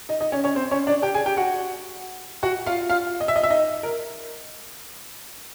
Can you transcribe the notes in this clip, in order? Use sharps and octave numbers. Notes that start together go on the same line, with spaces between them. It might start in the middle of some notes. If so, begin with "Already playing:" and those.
D#4 D#5
D#4 D#5
C#4 C#5
C#4 C#5
C4 C5
C#4 C#5
D4 D5
G4 G5
G#4 G#5
G4 G5
F#4 F#5
F#4 F#5
F4 F5
F4 F5
D#5
E5
D#5
E5
D#4 D#5
A#4